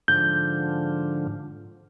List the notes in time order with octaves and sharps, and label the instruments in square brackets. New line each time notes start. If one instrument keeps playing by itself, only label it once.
[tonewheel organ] G#2 D3 F3 [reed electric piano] G6